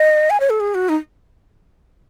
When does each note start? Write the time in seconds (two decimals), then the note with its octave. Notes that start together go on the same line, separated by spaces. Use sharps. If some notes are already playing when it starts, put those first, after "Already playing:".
Already playing: D#5
0.30 G#5
0.40 C#5
0.50 A4
0.60 G#4
0.75 F#4
0.89 D#4